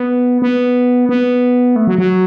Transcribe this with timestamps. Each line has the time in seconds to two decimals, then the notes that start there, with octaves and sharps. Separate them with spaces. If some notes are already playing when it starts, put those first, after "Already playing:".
Already playing: B3
0.42 B3
1.09 B3
1.76 A3
1.87 F#3
1.98 F#3